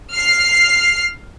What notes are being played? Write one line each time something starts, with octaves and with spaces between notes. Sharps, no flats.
F6 C7